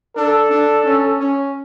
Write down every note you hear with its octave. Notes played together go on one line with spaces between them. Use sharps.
D4 A4
D4
C#4
C#4